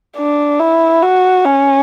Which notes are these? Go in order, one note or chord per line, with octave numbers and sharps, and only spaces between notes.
D4
E4
F#4
C#4